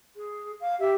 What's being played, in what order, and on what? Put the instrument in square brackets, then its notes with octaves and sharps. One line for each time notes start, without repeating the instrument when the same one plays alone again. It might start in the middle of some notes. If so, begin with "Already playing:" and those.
[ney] G#4
F5
[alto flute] G4 [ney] E5